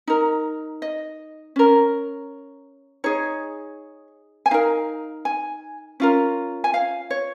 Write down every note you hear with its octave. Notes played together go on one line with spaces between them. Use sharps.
D#4 A#4
D#5
C#4 A#4
D#4 G#4 C#5
G#5
D#4 A#4 F5
G#5
C#4 F4 A#4
G#5
F5
C#5